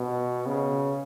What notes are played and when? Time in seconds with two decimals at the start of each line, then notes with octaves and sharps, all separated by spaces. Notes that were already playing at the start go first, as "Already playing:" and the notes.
Already playing: B2
0.46 C#3